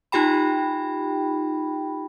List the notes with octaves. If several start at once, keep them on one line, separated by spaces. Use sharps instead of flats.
D#4 F4 G4 G5 B5